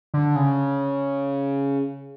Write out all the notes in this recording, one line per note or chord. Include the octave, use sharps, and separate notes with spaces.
D3
C#3